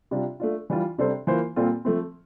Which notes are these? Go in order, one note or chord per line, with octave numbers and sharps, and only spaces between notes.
C3 G3 D4 F4
A3 D4 F4
E3 G3 D4 F4
C3 G3 D4 A4 C5
E3 A#3 F4 C5
A#2 G3 C4 F4 A4
F3 A3 C4